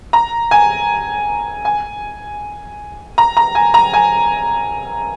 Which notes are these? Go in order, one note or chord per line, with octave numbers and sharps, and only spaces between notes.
A#5
G#5
G#5
A#5
A#5
G#5
A#5
G#5